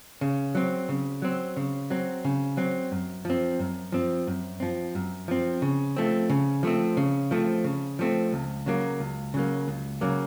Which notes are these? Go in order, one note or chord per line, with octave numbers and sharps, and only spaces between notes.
C#3
F#3 C4
C#3
F#3 C4
C#3
F#3 C4
C#3
F#3 C4
F#2
F3 C4
F#2
F3 C4
F#2
F3 C4
F#2
F3 C4
C#3
F3 A3 C4
C#3
F3 A3 C4
C#3
F3 A3 C4
C#3
F3 A3 C4
C#2
C#3 F#3 A#3
C#2
C#3 F#3 A#3
C#2
C#3 F#3 A#3